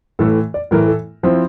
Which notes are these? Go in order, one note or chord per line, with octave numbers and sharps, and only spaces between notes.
A2 E3 A3 A4
D5
A2 E3 A3 A#4
A4
F3 C4 E4 C5